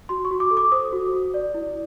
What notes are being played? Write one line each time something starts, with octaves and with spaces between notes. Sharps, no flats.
F#4 C6
C#6
F#4
D6
A4
D6
C5 D#6
F#4
F#4
D5
E4